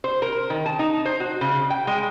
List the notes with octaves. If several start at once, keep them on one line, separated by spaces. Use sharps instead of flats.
C5
A#4
D#3
A5
D#4
C5
F#4
C#3
G5
G#3